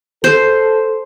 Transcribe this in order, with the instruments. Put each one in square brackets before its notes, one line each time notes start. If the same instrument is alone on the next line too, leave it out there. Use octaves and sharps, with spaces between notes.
[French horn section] A4 [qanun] C5